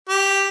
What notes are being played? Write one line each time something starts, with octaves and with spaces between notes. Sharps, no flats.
G4